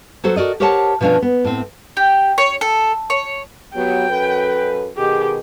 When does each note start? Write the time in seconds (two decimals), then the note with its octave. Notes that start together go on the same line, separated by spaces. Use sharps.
0.24 F#3 F#4 A4 C5
0.36 F#4 A#4 D5 D#5
0.60 G4 A#4 C5 C#5 F#5 A5
1.01 B2 F3 C#4 D4 F5
1.22 B3
1.44 A2 C4
1.97 G4
2.38 C#5
2.61 A4
3.10 C#5
3.74 F#3 B3 G4 G5
4.09 F#2 A4 B4
4.97 B2 D#3 G4 G#4